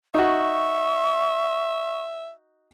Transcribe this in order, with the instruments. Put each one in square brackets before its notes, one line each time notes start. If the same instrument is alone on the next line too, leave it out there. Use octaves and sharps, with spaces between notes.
[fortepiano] D#4 F#4 [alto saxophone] E5 [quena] C#6